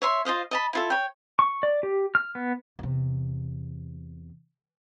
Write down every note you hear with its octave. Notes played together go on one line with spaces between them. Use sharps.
C#5 E5 C6
F4 C5 D#5 F5
D#5 A5 B5
E4 F4 A4
C#5 G5
C#6
D5
G4
F6
B3
E2 C3